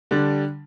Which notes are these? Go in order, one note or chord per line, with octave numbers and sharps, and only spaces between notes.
D3 G3 D4